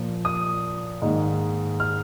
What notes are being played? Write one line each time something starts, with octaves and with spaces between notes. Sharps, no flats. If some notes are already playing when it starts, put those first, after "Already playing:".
Already playing: A#2 F3 A#3
D#6
G#2 D#3 A#3 D#4
F6